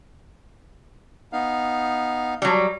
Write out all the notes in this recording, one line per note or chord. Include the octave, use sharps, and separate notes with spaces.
B3 D#4 F5
F#3 G3